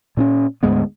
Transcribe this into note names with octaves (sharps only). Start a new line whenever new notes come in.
A#2 C4 C#4
D2 G#2 G#3 B3